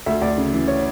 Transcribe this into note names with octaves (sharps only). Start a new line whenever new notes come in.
D2 E5
D2 D5
C#3
E3
C#5